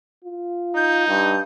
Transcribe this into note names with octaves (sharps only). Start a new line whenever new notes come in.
F4
D#4 G6
G2